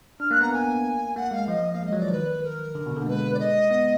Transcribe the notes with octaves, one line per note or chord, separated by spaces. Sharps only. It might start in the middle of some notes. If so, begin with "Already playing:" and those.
D4 F6
A#3 F#6
B3 A#5
A#3 G#5
A#3 F#5
G#3 F5
F3 D#5
A#3 F5
G#3 D#5
F#3
F3 D5
D#3 B4
A#4
D3
B2
D3
A#3
G#3 B4
D5
D#5
B3